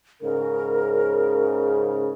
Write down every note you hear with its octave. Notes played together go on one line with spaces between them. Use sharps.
G#2 C#3 A#4